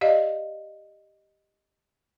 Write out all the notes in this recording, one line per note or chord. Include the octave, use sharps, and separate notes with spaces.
G4 D5 D#5 F5